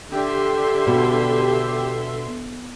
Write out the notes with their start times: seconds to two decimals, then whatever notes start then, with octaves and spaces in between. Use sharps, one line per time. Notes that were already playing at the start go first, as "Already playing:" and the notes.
0.12 D3 G4 E5 C6
0.87 B2